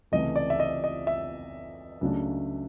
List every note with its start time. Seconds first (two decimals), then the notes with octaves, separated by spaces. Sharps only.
0.12 C#2 C3 E3 A3 D#5
0.36 D5
0.50 E5
0.60 D#5
0.84 D#5
1.07 E5
2.01 C#2 C#3 F#3 A3 D4